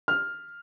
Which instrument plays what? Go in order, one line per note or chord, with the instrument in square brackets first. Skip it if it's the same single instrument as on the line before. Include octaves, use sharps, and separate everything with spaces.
[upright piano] F6